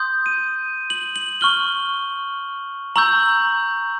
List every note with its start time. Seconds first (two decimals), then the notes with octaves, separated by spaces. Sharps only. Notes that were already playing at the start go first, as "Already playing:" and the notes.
Already playing: C6 D#6 G6
0.26 D#7
0.90 F#7
1.16 F#7
1.41 C#6 F6 G7
2.96 A#5 C#6 E6 G6 F#7